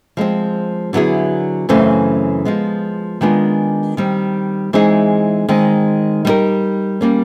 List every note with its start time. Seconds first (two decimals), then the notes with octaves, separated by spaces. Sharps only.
0.17 F3 G#3 C4
0.93 D3 F#3 B3 E4 G#4
1.69 F#2 C#3 E3 A3 C4
2.45 F3 G#3 B3
3.21 D#3 G#3 B3 D4 F4
3.97 D#3 G3 C4
4.73 E3 G#3 C4 D#4 G#4
5.49 D#3 G#3 C4
6.25 G3 B3 D#4 G4 A#4
7.01 G3 A#3 C#4